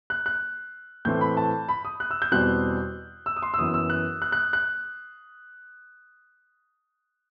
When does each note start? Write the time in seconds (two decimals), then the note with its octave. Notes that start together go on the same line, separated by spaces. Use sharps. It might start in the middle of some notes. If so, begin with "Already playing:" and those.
0.10 F#6
0.26 F#6
1.05 A2 E3 A3 C4 G6
1.21 B5
1.37 A5
1.69 B5
1.85 D#6
2.00 F#6
2.11 E6
2.22 G6
2.32 E2 B2 G3 C4 F#6
3.26 E6
3.37 D#6
3.42 C6
3.54 E6
3.58 F#2 E3 B3 D#6
3.74 E6
3.90 F#6
4.22 F#6
4.32 F#6
4.53 F#6